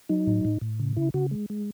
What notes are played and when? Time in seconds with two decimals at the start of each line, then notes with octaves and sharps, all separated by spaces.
0.09 F#3 D#4
0.27 A2
0.45 A2
0.61 A2
0.80 C#3
0.97 C#3 E4
1.14 C#3 F#4
1.31 G#3
1.50 G#3